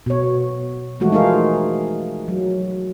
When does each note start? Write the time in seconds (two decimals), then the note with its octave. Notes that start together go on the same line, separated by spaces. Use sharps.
0.06 B2 C#5
1.00 E3 F3 G#3 A3 F#4
1.12 D#4 F4 G#4 A#4 F5
2.28 F#3